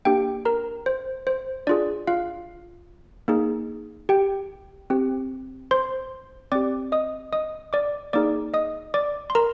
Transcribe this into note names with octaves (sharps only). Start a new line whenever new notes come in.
A#3 D4 G4 G5
A#4 A#5
C5
C5
D4 F4 G#4 D5
F4 F5
A#3 D#4 G#4
G4 G5
C4 G4
C5 C6
C4 G4 D5 D6
D#5 D#6
D#5 D#6
D5 D6
A#3 D#4 G#4 D5 D6
D#5 D#6
D5 D6
C6
A#4 A#5